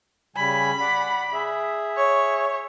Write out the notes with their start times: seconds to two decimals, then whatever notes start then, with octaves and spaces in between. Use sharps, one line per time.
0.36 C#3 G3 G#5 B5
0.81 D5 F#5
1.33 G#4 E5
1.97 C#5